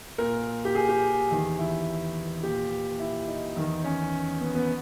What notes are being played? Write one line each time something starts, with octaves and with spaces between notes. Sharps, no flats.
A#2 A#4
G4
G#4
G4
E2 D#3
E4
A#2 G4
E4
D#4
E2 D#3
C#4
B3
B3